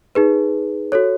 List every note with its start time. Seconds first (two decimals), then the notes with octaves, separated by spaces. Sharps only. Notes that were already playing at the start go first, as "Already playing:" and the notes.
0.15 D#4 G#4 B4
0.92 F#4 A4 C#5